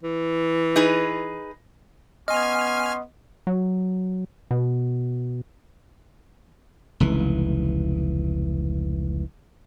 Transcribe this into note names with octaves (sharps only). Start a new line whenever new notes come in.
E3
D#4 G#4 B4
B3 C#4 D#5 G#5 C6 F6
F#3
B2
F1 C#2 E3